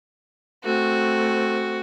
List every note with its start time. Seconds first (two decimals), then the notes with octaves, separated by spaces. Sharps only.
0.64 A3 C4 F#4